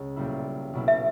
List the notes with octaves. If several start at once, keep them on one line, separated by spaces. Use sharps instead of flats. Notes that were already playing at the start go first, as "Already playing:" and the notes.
Already playing: C#2
B1 A#2 G3 A#3 E4
B1 B2 A#3 E4
E5